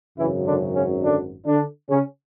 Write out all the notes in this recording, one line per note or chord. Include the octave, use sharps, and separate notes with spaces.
G#1 F#2 C#3 E3 F#3 E4
D3 D4
C#3 C#4
D3 D4
D3 D4
C#3 C#4